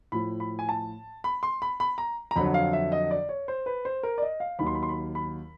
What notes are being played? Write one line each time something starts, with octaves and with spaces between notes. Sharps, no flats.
A2 F3 B5
B5
G#5
A5
B5
C6
B5
B5
A#5
A#5
F2 D3 F#3 B5
F5
E5
D#5
D5
C#5
C5
B4
C5
A#4
D5
D#5
F5
D#2 D#3 F#3 B5
C6
B5
C6
B5
B5